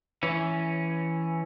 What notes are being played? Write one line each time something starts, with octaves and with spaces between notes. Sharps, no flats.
E3 C#4